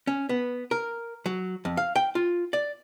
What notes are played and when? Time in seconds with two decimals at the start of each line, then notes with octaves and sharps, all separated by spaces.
0.07 C#4
0.29 B3
0.71 A#4
1.26 F#3
1.65 F2
1.77 F5
1.96 G5
2.15 F4
2.53 D5